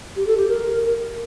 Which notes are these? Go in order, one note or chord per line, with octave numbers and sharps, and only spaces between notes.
G4
A4
G4
A#4